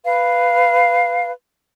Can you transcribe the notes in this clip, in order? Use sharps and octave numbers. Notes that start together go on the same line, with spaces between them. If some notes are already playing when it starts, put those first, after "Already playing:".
B4 F5